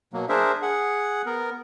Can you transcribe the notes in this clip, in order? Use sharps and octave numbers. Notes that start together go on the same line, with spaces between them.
B2 F#3 A#3
D4 G#4 A#4 C5 E5
G#4 F#5
B3 A#4